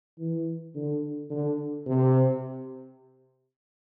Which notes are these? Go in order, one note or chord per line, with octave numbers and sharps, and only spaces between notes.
E3
D3
D3
C3